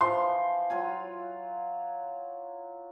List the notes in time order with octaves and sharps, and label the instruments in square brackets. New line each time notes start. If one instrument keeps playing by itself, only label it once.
[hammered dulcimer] E3 F3 [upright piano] C6
[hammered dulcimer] F#3 F4 G#5